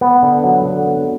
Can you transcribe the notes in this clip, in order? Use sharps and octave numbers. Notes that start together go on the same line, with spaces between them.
B3
D3
F#3
D3
B3